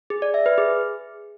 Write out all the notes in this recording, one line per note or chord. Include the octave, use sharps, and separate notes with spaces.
G#4
D5
E5
B4
G#4